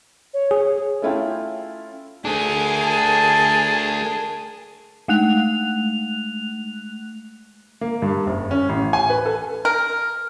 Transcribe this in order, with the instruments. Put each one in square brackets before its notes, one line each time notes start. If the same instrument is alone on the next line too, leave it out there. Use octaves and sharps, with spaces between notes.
[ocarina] C#5
[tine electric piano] G#4
[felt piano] A3 C#4 E4 F4 G5
[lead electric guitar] A3 D4 [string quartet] G#4 A#4
[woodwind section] A5
[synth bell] G#3 A3 F#6 F7
[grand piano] A#3
G2
F#1
C#4
A1
G#5
B4
A4
[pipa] A#4